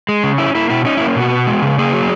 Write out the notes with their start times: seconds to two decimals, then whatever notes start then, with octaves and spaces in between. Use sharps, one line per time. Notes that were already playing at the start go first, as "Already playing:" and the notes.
0.09 G#3
0.23 C#3
0.38 C#4 E4
0.55 A#3 E4
0.70 B2 E4
0.85 C#4 D#4
0.97 E4
1.01 A#3
1.16 B2 F#4
1.33 B3
1.47 G#3
1.62 C#3
1.78 A#3 G#4
1.93 F#3